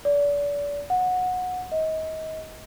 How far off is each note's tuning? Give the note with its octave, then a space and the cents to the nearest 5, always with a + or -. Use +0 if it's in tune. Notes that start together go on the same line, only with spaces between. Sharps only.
D5 -35
F#5 -20
D#5 +30